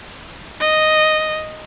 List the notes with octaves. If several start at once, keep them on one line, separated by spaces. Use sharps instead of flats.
D#5